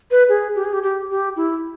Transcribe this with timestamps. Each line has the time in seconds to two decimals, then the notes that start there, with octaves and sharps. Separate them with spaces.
0.11 B4
0.29 G#4
0.56 G4
0.64 G#4
0.73 G4
0.83 G4
1.10 G4
1.36 E4